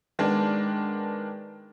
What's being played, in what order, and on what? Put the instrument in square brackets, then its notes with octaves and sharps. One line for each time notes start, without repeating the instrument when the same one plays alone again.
[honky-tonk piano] D#3 G#3 B3 D4